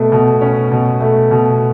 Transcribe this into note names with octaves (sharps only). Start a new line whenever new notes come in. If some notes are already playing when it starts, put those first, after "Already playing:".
Already playing: B2 A3
B2
C#4
B2
A3
B2